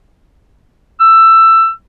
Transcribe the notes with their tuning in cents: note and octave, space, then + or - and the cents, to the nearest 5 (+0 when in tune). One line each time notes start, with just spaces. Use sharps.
E6 +15